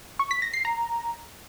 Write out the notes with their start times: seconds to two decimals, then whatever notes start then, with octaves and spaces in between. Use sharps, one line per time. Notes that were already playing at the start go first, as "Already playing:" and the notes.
0.19 C#6
0.31 B6
0.42 A#6
0.53 C7
0.65 A#5